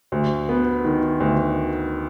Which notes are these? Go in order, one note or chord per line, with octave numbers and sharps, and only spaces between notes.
D2
B3
D#3
D2